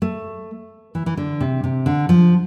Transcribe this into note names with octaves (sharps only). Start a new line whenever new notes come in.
A3
E3
E3
D3
C3
C3
D3
F3